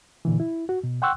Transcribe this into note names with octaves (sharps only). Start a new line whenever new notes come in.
A#2 D3 E3
E4
F#4
B2
F#5 G5 C6 C#6 E6 F#6